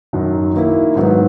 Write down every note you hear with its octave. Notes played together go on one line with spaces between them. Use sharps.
F#2 D#3 F#3
D#3 A#3 E4
G#2 D#3 F#3 B3